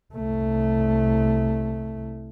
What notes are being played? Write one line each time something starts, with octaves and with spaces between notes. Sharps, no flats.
C2 A3